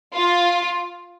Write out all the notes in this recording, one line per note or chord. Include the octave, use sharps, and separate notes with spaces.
F4